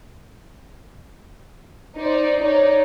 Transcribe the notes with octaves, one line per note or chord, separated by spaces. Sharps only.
D#4 C5 D5
D#4 C#5 D5